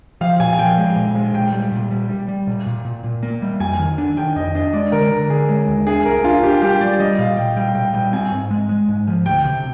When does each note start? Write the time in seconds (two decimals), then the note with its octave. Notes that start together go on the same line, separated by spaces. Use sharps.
0.21 F3 F5
0.40 A#2 G#5
0.53 G#5
0.59 F3 G5
0.78 G#3
0.96 A#2
1.15 G#3
1.34 A#2 G5
1.53 G3
1.72 A#2
1.91 G3
2.09 G3
2.28 G3
2.47 A#2
2.67 A#2
2.85 A#2
3.04 A#2
3.23 A#3
3.42 G3
3.60 F2 G#5
3.79 D#3
3.98 D4
4.17 D#3 G5
4.36 F2 D#5
4.55 D4 D#5
4.73 G#3 D5
4.92 D3 A#4
5.11 D3 A#4
5.30 D3 G#4
5.49 G#3
5.68 D#2
5.87 D4 G#4
6.05 C2 A#4
6.24 D4 F4
6.43 D4 G4
6.62 G3 G4
6.81 G3 D5
7.00 G3 D#5
7.19 A#2 F5
7.37 A#2 G5
7.56 G3 G5
7.75 A#2 G5
7.94 G3 G5
8.13 C4 G#5
8.32 G#2
8.51 G#3
8.69 G#3
8.89 G#2
9.07 F3
9.26 D2 G5
9.45 C3